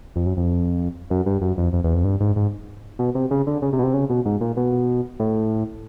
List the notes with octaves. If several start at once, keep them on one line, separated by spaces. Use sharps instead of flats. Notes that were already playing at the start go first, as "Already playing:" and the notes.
F2
F#2
F2
F#2
G2
F#2
F2
F2
E2
F2
G2
G#2
G#2
B2
C3
C#3
D3
C#3
C3
B2
C3
C#3
B2
G#2
A#2
B2
A2